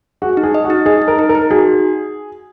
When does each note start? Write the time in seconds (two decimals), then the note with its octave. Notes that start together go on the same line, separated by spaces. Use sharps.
0.22 F#4 G#4
0.37 D#4
0.43 G#4
0.54 D#5
0.65 F#4
0.70 D#4
0.86 G#4 D#5
1.02 D#4
1.08 A#4
1.19 D#4
1.29 A#4
1.35 D#4
1.50 F#4 G#4